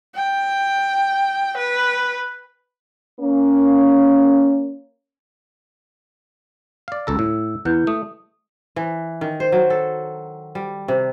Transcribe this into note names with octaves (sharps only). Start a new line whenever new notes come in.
G5
B4
A#3 C#4
D5 F5
C#2 A4 A#5 E6
A2
E2 E4 B4 F#5 G6
A3 D#6
E3
D#3
C5
F#3
A4
G3
C3